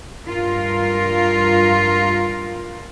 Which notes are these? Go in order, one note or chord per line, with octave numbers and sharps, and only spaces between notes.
G2 F4 A#4